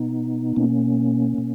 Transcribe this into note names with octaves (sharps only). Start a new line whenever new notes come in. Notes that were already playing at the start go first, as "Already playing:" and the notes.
Already playing: B2 B3 D#4
B2 A#3 C#4
B2